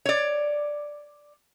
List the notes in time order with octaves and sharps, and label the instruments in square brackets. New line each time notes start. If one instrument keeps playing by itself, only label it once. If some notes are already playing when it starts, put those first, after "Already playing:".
[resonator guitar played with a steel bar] C#5 D5